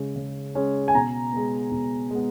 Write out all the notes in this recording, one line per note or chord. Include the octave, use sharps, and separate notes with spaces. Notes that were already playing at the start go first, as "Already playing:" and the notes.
Already playing: C#3 G#3 C#4
C#3
G#3 C#4
G#5
B2 A#5
G#3 B3
B2
G#3 B3